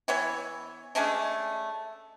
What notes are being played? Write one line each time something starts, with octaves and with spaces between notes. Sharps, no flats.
E3 B3 C#5
G#3 A3 C#4 D4